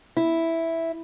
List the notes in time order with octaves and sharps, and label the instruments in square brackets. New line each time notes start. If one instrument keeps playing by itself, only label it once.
[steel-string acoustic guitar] E4